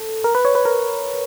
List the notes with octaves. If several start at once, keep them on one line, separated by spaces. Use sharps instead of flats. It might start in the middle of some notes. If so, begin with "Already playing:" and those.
Already playing: A4
A#4
B4
C#5
B4
A#4